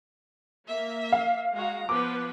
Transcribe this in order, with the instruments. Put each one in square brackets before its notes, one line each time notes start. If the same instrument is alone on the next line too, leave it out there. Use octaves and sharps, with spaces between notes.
[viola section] A#3 E5
[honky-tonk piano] F5
[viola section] G#3 F#4 A#5
[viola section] F3 B3 B4 [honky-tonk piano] D6